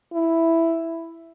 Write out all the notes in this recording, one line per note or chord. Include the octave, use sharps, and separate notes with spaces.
E4